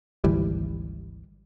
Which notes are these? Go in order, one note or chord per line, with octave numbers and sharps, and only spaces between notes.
G#1 D2 E3 G3